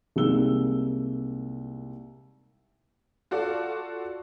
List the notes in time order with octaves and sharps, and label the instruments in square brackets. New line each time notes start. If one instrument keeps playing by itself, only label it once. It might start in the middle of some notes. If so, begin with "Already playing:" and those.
[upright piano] C2 G#3 A#3 D#4 E6 G7
[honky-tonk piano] F4 F#4 A4 D5